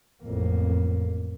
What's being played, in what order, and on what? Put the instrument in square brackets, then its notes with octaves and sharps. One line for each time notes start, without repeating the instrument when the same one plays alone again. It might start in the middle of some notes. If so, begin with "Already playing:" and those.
[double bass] A1 A#3 [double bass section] F2